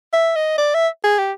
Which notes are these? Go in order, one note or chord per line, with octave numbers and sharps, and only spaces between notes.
E5
D#5
D5
E5
G#4
G4